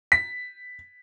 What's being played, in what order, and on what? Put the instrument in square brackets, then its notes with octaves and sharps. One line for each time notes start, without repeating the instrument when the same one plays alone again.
[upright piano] B6